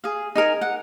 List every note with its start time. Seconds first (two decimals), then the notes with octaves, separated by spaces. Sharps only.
0.04 G#4 F5
0.35 D#4 G#4 A#4 G#5
0.61 F#5